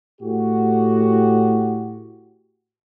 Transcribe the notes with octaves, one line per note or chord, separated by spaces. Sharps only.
A2 F#4 G4